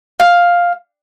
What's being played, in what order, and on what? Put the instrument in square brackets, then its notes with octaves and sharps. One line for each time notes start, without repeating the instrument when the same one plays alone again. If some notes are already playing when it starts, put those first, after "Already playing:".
[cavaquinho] F5